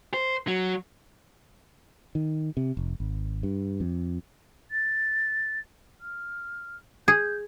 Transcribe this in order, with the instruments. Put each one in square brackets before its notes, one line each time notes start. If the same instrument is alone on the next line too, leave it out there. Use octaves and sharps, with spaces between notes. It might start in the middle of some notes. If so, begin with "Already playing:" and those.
[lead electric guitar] C5
F#3
[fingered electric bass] D#3
C3
F1
G#1
G2
F2
[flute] A6
F6
[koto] G#4 [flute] G6